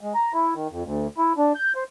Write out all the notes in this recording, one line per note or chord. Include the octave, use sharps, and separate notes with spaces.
G#3
A#5
E4
D#3
F2
D2
E4
D4
G6
C5